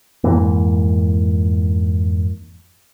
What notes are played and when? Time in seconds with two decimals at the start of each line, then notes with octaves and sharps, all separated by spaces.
0.24 F2 G#2 E3 A#3